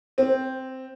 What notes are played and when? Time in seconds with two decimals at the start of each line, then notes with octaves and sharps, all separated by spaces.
0.18 C4